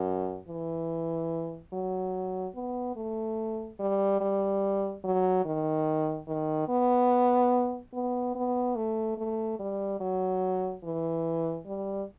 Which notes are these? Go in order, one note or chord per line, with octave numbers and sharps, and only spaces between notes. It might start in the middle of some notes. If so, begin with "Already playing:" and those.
Already playing: F#2
E3
F#3
B3
A3
G3
G3
F#3
D#3
D#3
B3
B3
B3
A3
A3
G3
F#3
E3
G3